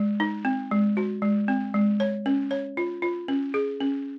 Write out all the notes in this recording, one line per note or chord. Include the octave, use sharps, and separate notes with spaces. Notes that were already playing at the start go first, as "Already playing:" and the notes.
Already playing: G#3
D#4
C4
G#3
F#4
G#3
C4
G#3
C#5
C#4
C#5
F4
F4
C#4
G#4
C#4